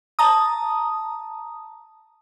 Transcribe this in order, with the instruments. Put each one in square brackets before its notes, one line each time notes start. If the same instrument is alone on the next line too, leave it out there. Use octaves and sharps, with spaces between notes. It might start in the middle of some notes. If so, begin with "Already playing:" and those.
[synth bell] A5 A#5 D#6